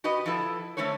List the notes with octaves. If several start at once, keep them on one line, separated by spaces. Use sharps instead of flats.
F#4 G4 B4 D#5
F3 E4 A4 B4
D3 A3 C#4 F#4 C5 C#5